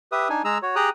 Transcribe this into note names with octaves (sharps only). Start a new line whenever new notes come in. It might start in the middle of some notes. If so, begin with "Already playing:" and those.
G4 B4 E5 D#6
D4 D#4 G#5
G#3 G#4 A#5 E6
F#4 C#5
G4 G#4 G5 A#5 D#6 F#6